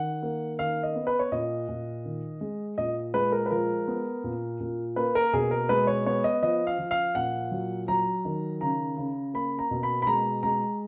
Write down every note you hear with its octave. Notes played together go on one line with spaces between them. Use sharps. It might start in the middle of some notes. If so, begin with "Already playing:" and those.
Already playing: D#3 F#5
A#3
D#3 F5
D#5
B3
B4
C#5
A#2 D#5
A#2
D#3
G#3
A#2 D#5
G#3 B4
A#4
B4
F3 A#4
B3
A#2
A#2
A#3 B4
A#4
B2 G#4
A#4
G#3 B4
C#5
B3 C#5
D#5
F3 D#5
F5
F3
F5
A#2 F#5
F#3
F#3 A#5
D#3
C#3 A#5
C#3
A#3 B5
A#5
B2
B5
B5
G#3 A#5
G#3 A#5